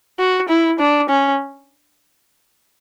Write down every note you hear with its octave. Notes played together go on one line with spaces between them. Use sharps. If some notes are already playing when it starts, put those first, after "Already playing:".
F#4
E4
D4
C#4